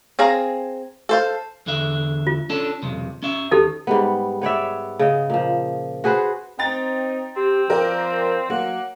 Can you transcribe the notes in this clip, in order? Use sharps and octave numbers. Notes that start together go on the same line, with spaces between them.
C4 G#4 F5 A#5
A4 C5 F5
E2 D3 E5
F4
C#4 D4 A4
B1 E2 C3
C#4 E5
D#2 D#4 G4 A4
G#2 G3 B3
B3 C#5 D5 E5
C#3 D#5
A#2 F3
F#4 G#4 B4 C5
C4 D#4 G5 A#5 A6
C4 G4
F3 A#4 D5 G5
F#3 A#3 F#5